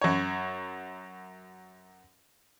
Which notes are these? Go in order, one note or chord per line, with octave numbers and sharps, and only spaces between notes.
F#2 C#5